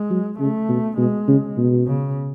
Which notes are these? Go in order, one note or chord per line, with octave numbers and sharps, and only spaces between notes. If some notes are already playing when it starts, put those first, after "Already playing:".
Already playing: G#3
F#3
C#3 A3
B2
B2 G#3
C#3
B2
C#3